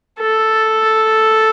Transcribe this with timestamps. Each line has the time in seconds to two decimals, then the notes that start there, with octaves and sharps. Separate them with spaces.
0.20 A4